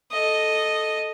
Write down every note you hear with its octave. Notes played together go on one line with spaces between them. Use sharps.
A4 D#5